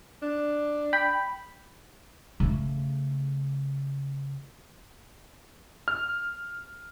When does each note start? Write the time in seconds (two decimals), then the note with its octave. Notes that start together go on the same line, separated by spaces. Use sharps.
0.22 D4
0.93 G5 B5
2.40 C#3 A3
5.88 F6